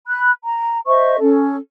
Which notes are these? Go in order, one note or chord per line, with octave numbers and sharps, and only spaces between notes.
B5 F#6
A#5
C5 D#5 E5 C#6
C#4 A4